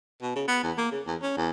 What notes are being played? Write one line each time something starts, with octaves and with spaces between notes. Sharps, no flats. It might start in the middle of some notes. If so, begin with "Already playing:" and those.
B2
C#3
B3
E2
A#3
C#3
E2
C#4
E2